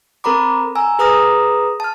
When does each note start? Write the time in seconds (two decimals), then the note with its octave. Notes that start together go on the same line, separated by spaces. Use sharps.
0.24 C4 A4 A#4 A#5 B5 D6
0.75 G#5 A#5 E6
0.99 G#4 B4 A#5 D#6 F6 A#6
1.80 A5 F6